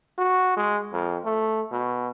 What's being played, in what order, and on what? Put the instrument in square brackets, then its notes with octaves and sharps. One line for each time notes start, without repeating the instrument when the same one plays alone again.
[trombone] F#4
G#3
F2
A3
B2